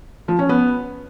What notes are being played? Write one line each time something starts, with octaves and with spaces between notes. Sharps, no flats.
F3
C#4
B3